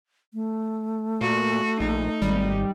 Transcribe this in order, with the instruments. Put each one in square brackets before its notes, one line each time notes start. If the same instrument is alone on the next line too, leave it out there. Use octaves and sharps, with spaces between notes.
[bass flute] A3
[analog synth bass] A#2 [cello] F#4
[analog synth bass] A#1 [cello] D#4
[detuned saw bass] G#1 [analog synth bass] G3